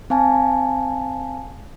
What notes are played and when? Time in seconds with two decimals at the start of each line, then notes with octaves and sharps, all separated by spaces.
0.10 C4 F5 G#5 A5